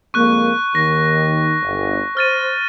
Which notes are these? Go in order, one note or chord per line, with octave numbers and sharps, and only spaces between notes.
F2 G#3 A#3 C#6 F#6
D#2 D#3 A#6
G1
C5 F6 A6 D#7